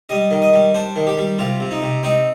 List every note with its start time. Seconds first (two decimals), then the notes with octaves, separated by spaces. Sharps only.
0.09 G3 D#5
0.31 D#3
0.42 D#5
0.53 G3
0.74 D4 C5
0.96 D#3
1.07 G4
1.18 G3
1.39 C3 F4
1.60 C3
1.71 D#4
1.82 C3
2.03 C4 D#4